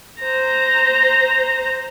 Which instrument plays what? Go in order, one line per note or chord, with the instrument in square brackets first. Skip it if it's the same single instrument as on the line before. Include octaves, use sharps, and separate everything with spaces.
[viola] C5 A#5